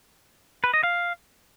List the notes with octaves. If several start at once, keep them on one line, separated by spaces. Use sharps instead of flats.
B4
D#5
F5